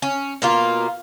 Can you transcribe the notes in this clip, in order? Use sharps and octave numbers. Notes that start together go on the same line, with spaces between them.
C#4
B2 A#3 F4